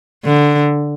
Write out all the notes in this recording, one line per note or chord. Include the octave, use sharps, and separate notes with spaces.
D3